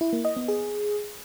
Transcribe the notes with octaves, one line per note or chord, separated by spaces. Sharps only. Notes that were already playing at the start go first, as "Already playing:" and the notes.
E4
A#3
D#5
B3
G#4